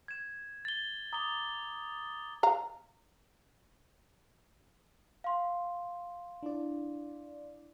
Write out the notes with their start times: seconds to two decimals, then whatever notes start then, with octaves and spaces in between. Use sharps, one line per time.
0.08 G#6 E7
0.65 A6 G7
1.13 A#5 D6 D#6 G7
2.43 F5 A#5
5.24 F5 C6
6.43 D4 E4 D5